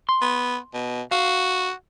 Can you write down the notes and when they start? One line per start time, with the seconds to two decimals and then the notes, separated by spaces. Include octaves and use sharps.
0.09 C6
0.22 B3
0.74 B2
1.11 F#4 F5